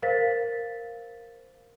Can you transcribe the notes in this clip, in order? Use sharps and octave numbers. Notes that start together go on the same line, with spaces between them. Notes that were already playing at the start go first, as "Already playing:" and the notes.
A#4 C5 F5 A6 B6